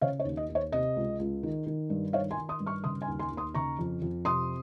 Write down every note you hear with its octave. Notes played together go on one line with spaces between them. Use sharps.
C#3 C#5 F5
C#5
D#2
D#5
D#2
C#5
C3 D#5
C#2
C#2
D#3
D#3
G2
D#3 C#5 F5
G#5 C6
D#3
C6 D#6
G2
C#6 F6
C#3 C6 D#6
G#5 C6
D#2
G#5 C6
D#2
C6 D#6
C#3 A#5 C#6
F2
F2
C3 C6 D#6